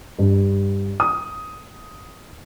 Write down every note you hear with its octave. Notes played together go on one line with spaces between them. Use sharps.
G2
D#6